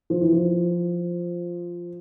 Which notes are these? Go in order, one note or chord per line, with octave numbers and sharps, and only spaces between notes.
F3
E3
F3